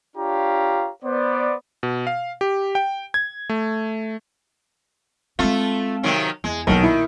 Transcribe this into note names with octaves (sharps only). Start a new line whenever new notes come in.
D4 F4 G4 C#5 F5 A#5
B3 C5 D5
B2
F5
G4
G5
G#6
A3
G#3 A3 C4 F4
C3 D#3 F#3
E2 G#3
B1 A#2 D#3 D#4
E4